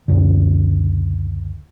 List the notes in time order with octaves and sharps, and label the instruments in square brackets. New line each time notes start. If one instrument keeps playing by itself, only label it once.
[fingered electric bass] C#2 F#2 A#2 D3